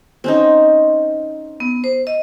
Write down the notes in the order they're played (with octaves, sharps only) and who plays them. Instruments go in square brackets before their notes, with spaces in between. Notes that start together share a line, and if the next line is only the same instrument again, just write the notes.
[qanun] C4 C#4 D#4
[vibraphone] B3
C5
D#5